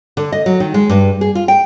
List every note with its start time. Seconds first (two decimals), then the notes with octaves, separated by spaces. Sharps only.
0.17 D3
0.32 D#5
0.46 F#3
0.60 D#3
0.74 G#3
0.89 G2
1.21 G#4
1.35 F4
1.48 G5